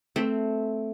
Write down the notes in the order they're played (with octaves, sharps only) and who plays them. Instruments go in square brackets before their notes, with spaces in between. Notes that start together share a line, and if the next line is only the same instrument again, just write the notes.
[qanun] A3 C4